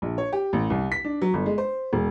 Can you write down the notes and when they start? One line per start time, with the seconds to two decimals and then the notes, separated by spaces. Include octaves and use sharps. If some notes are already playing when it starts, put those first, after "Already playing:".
0.02 A#1
0.18 C#5
0.33 G4
0.53 A1
0.70 C2
0.92 B6
1.05 D4
1.22 F#3
1.34 G1
1.46 G#3
1.58 C5
1.93 E1